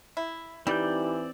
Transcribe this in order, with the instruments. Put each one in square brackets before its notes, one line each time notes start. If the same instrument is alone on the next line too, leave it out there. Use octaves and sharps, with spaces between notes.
[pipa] E4
[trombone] E3 [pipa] G3 [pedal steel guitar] C4 D5 G6 [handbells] D#4 E4 G4